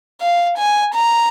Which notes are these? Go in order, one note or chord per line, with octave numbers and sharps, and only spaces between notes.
F5
G#5
A#5